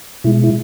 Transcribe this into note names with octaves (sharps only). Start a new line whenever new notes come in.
B2 G#3 E4
E4